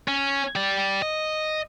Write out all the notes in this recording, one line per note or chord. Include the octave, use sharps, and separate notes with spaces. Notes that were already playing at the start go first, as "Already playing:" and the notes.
C#4
G4 D5
D#5